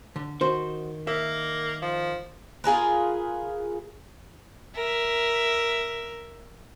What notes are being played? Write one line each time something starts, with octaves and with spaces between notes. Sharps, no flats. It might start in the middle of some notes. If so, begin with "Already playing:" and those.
D3
D#3 F#4 C5
A#3 E5
F3
F4 G#4 A#4 B4
A#4 E5